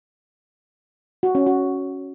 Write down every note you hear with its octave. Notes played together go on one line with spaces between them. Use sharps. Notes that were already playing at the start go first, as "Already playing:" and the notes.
F#4
C#4
F#4